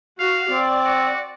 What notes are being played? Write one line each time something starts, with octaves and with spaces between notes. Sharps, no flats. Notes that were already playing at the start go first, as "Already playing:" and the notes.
F#4 F5
C4 D5
F#4